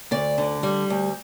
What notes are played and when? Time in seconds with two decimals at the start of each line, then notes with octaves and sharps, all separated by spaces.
0.11 D2 D5
0.38 D3
0.63 G3
0.90 D2